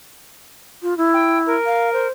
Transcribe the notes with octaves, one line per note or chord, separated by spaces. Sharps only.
F4
E4
G5
A#4
F5
C5